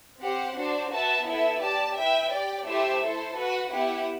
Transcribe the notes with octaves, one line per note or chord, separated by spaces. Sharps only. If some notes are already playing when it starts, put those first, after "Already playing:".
C4 G4 C5 F#5
D4 F#4 C5
F#4 B4 E5 A5
B3 E4 A4 E5
G4 D5 A5
E4 B4 E5 G5
G4 D5 G5
A3 E4 G4 C5 E5
E4 A4 C5
F#4 B4 F#5
B3 E4 G4 B4 F#5